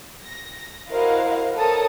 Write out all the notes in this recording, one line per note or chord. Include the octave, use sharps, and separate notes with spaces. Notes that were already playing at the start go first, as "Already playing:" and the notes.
A#6
E4 F#4 A#4 C5 D#5 F5
A4 A#4 C#5 A5 D#6